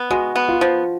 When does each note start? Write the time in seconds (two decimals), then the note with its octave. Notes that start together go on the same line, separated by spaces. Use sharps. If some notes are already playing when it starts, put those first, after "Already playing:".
Already playing: B3
0.10 G#3 F#4
0.36 B3
0.49 F4
0.61 F3